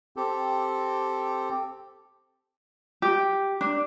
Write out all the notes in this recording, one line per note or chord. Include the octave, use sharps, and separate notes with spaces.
C4 G4 A4
G4
D4